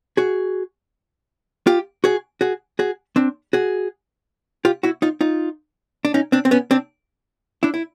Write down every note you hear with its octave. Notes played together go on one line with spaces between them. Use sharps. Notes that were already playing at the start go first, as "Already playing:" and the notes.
F#4 G#4
F4 G4
F#4 G#4
F#4 G#4
F#4 G#4
C4 D4
F#4 G#4
F4 G4
E4 F#4
D#4 F4
D#4 F4
D4
C#4 D#4
C4 D4
C4
B3 C#4
C4 D4
D4 E4
E4